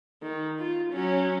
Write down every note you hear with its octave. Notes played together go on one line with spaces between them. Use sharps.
D#3
F4
F#3 C#4